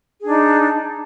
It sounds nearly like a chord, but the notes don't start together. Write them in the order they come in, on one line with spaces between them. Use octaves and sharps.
G#4 D4 D#4